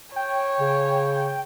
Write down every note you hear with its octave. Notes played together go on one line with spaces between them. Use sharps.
C#5 G5
C#3